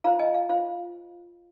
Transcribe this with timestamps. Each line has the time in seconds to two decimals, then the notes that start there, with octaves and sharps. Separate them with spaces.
0.04 F4 C5 F5 A#5
0.19 D#5 G#5
0.34 F5
0.49 F4 C5 F5